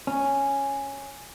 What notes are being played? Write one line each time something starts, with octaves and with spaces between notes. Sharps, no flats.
C#4